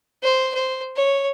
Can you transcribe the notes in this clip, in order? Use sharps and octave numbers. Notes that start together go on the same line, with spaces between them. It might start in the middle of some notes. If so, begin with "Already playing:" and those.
C5
C5
C#5